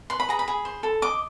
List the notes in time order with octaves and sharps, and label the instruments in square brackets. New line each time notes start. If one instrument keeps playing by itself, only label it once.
[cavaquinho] B4 C6
B5
G#4 A#5
B5
G#4
C5
A4
D#5 D6